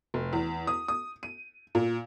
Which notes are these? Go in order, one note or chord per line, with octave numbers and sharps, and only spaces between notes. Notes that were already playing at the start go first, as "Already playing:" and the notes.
F1
E2
D#6
D#6
D#7
A#2